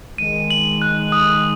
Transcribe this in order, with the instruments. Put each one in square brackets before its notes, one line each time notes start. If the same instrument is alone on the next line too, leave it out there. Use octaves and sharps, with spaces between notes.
[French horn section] D#3 G#3 [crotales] D#7
[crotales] F#7
F#6
D#6